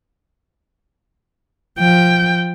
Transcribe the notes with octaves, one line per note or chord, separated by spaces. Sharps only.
F3 G5